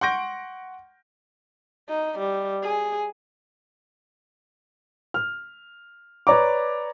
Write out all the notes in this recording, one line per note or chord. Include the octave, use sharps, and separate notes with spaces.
F#5 C6 C#6 G6 A#6 D7
D#4
G3
G#4
F6
B4 C#5 D5 A#5 D6